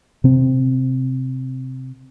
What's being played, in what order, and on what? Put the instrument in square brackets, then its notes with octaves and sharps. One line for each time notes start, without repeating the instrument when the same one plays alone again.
[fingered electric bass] C3 C4